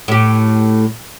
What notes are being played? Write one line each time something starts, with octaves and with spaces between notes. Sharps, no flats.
A2 G4